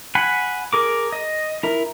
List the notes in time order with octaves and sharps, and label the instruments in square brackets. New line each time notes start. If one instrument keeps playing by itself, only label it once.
[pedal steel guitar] F#5 G#5 B5
G#4 A#4 D6
D#5
E4 A#4